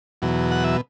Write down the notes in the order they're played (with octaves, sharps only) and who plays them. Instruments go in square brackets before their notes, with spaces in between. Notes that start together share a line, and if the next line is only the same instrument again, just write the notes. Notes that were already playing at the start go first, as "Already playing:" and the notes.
[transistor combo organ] E2 B2 F#3
F#5
E5